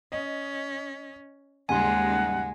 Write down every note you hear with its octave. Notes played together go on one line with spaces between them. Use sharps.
C#4 D#5
D#2 G#2 C#3 G3 G#3 F#5 G#5 C6